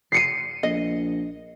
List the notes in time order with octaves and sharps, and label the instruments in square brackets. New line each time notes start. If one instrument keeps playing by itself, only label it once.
[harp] C7 C#7 D#7
[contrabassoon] A#1 [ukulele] D#5